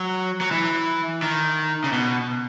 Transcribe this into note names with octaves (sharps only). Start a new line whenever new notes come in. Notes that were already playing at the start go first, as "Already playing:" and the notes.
Already playing: F#3
F#3
E3
D#3
C#3
B2